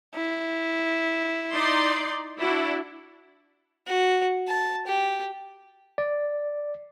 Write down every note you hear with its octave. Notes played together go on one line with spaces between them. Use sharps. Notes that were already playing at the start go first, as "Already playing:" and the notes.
E4
D#4 D5 C6
D4 E4 F#4
F#4
A5
G4
D5